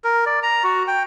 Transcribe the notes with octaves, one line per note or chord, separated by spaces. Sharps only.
A#4
D5
A#5
F#4
G5